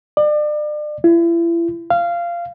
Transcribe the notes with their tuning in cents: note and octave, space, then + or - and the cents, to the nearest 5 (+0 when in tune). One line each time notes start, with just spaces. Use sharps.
D5 +35
E4 +35
F5 -15